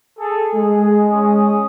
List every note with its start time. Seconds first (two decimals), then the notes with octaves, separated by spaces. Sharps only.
0.19 G#4 A4
0.55 G#3 G#4
1.12 C#4 D#6